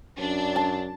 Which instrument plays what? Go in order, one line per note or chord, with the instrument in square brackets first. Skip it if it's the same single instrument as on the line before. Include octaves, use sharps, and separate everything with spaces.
[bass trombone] F#2 [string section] D4
[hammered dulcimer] A5